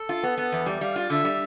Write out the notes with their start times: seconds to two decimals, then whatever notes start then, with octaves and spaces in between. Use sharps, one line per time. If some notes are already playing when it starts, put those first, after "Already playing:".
Already playing: A4
0.09 F4
0.23 B3
0.38 B3
0.52 E2
0.66 G3
0.81 G3 F5
0.96 F4
1.10 D3 E5
1.25 G3